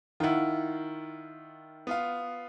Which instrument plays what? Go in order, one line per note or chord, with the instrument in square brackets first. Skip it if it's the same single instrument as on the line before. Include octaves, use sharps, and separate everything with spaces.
[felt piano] D#3 E4 [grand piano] F4 F#5
[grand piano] B3 F4 F5